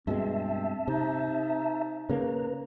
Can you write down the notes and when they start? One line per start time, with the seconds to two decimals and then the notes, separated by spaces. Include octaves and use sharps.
0.07 G2 B2 G#3 C4 E5 A5
0.88 C3 D#4
2.10 C#3 A#3 B4 A#5